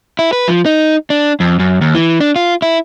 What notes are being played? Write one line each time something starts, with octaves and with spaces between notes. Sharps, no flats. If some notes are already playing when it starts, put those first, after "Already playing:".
E4
B4
F3
D#4
D4
F2
F#2
D#2
E3
D4
F4
E4